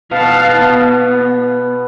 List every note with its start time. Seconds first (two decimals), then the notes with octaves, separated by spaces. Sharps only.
0.11 B2 F5 A5
0.62 B3